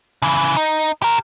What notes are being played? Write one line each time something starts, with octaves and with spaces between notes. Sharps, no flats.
C#3 E3
D#4
G4 A#4